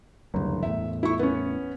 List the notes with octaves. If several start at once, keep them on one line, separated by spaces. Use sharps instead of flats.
F#1 D2 G2
E2 A2 E5
E4 C#6
B3 C#4